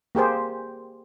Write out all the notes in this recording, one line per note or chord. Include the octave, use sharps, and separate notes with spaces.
A#3 G4 G#4 C5